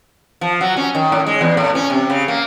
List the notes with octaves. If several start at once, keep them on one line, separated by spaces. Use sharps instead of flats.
F3
F#3
C#4
D#3
A2
G#3
E2
A2
C#4
C3
C#3
A#3